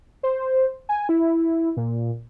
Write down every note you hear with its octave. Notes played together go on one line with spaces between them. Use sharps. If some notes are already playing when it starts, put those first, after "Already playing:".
C5
G#5
E4
A#2